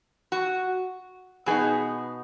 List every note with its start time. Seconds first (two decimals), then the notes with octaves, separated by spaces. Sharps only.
0.32 F#4
1.46 B2 B3 D#4 G#4